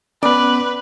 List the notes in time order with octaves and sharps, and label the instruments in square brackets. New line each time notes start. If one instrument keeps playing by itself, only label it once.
[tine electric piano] B3 C#4 [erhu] B4 [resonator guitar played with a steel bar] D5